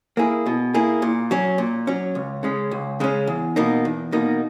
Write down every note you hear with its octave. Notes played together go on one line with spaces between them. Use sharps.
A#3 E4 G#4
B2
A#3 E4 G#4
A#2
F#3 C#4
A#2
F#3 C#4
C#2
C#3 G#3 C#4
C#2
C#3 G#3 C#4
E2
B2 A#3 D#4
E2
B2 A#3 D#4